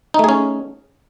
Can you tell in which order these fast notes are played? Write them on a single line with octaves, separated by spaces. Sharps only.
D#4 A3 G#4 C#4